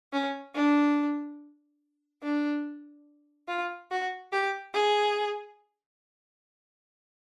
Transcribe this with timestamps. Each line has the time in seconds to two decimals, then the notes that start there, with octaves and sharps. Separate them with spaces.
0.13 C#4
0.55 D4
2.23 D4
3.48 F4
3.91 F#4
4.32 G4
4.74 G#4